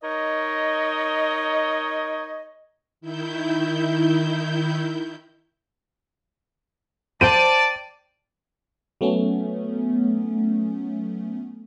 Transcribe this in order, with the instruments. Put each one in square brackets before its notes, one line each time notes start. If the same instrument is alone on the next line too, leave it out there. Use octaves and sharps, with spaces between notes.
[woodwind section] D#4 A#4 C#5 D#5
[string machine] D#3 E4 G6
[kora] C5 G5 [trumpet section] D5 [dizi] A5 [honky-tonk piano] D#7
[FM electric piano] F#3 A3 B3 C#4